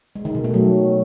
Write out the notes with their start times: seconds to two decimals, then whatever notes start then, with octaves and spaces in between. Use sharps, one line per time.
0.16 G#3
0.25 D#3
0.35 B2
0.44 A3
0.54 F#3